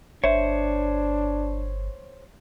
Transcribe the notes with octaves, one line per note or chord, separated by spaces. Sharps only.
G1 D4 C5 C#5 E5